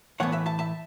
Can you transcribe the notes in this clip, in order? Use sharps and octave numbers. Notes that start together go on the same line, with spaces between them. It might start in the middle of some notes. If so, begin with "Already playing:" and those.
A2 E3 B3 C#5 F#5
B4 E5
E5 A5
E5 A5